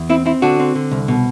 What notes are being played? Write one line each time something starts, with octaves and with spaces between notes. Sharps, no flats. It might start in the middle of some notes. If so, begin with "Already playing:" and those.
Already playing: E2
C4 E4
C4 E4
D3 D4 F#4
C4
D3
C2
B2